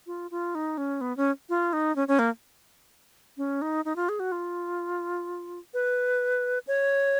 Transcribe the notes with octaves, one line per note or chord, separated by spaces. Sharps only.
F4
F4
D#4
C#4
B3
C#4
F4
D#4
C#4
C#4
A#3
C#4
D#4
D#4
F4
G#4
F#4
F4
B4
C#5